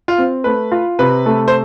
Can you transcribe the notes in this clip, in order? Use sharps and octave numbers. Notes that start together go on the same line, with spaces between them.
F4
C4
A3 B4
F4
C3 B4
A3
C5